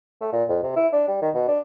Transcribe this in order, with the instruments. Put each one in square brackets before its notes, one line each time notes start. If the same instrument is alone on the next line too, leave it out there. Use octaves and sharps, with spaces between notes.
[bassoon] A3
A#2
F2
C3
E4
D4
G3
D#3
B2
D4